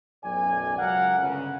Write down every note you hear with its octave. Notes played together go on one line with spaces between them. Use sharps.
B1 F#2 A2 D5 G5 G#5
C#2 F#3 A#4 F5 F#5
G1 C#2 C#3